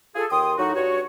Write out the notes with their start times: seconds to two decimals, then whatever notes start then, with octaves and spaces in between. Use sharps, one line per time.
0.16 F4 G#4 A4
0.31 D#2 G5 C6 D#6
0.58 A2 F#3 D#4 F#4
0.75 G2 F#4 C#5